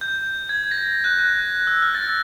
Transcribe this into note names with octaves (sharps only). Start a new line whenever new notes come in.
G6
G#6
A#6
F#6
F#6
E6
F6
A6